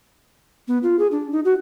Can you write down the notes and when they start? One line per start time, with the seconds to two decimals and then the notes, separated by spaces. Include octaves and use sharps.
0.68 B3
0.83 F4
0.99 G#4
1.12 D4
1.32 D#4
1.45 F#4